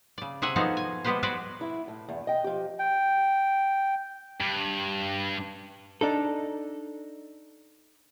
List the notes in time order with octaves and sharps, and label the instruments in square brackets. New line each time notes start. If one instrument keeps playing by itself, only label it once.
[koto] C#3 D5
C3 G#4 E5 F#5 G#5
F3 B3 D#4 F#4 G#4 A4
G#5
G3 G#3 B3 G4 B4 C5
F#4 G#4 B4 C5 D5
[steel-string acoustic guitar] E4
A2
E2 G2
D#5 G5
F3 G4
[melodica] G5
[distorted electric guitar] G2
[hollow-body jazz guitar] D4 D#4 A4